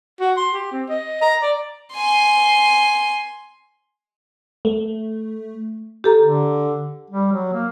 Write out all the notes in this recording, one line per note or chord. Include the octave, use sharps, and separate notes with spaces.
F#4
C6
G4
C4
D#5
A#5
D5
G#5 C6
A3
G4 A4 A#5
D3
G3
F#3
A#3